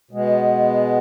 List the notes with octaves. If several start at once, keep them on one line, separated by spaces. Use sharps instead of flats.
B2 G#3 B3